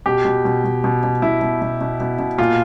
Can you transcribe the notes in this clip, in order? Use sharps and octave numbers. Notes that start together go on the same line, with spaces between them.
B2 G4
B2
B2
B2
B2
B2
B2 E4
B2
B2
B2
B2
B2
A#2 F4